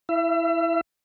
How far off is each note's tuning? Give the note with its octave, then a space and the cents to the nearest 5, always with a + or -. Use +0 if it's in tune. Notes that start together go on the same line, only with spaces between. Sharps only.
E4 +0 E5 +40